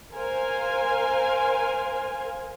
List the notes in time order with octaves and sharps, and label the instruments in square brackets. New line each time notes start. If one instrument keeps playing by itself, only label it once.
[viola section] A#4 C5 F5 G#5